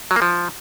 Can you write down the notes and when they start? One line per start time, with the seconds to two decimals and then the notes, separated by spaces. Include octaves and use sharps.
0.11 F#3
0.16 A#3
0.22 F3